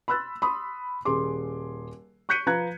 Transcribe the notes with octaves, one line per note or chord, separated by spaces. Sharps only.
B5 C6 E6 F#6 A6
B5 C6 D#6
D#1 G#4 C6 D6
C#6 F#6 G6 B6 C#7 D#7
F3 B4 A#5 F#6 G#6